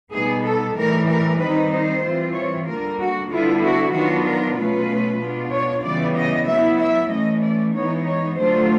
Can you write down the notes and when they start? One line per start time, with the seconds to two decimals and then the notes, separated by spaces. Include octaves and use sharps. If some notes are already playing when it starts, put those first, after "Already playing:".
0.12 B2 G3 B3 D#4 G#4
0.43 A4
0.75 A2 E3 G3 A#4
1.08 A#4
1.39 D#3 G3 C4 D#4 B4
1.71 C5
2.03 E3 G3 C4 F4
2.35 C#5
2.66 D3 G3 A#3 A#4
2.98 F#4
3.29 D3 G3 B3 E4 F4
3.61 F#4
3.93 D#3 F#3 B3 D4 F4 F#4
4.25 A#4
4.56 B2 F#3 A3 C#4 F4 B4
5.19 B2 G#3 B3 D4 F4
5.52 C#5
5.83 C#3 E3 G3 B3 D5
6.16 D#5
6.47 F#3 B3 E4 E5
6.79 E5
7.10 E3 A3 C#4 D#5
7.42 D5
7.74 E3 G#3 B3 D#4 C#5
8.06 C#5
8.37 D3 F#3 A3 D4 F4 C5